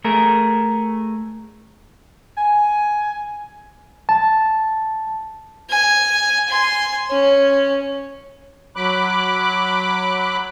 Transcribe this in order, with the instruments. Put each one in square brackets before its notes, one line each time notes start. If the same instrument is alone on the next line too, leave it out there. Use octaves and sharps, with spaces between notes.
[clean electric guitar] A3 G#4 A#4
[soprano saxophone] G#5
[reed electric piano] A5
[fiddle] G#5
G#5 C6
C#4
[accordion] F#3 B5 D6 F#6